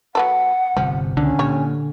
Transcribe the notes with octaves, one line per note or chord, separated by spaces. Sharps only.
F#3 B3 A4 F#5
G1 C3 F3 G3
C#2 B2 D3 D#3 C#4
A#2 G3 C#5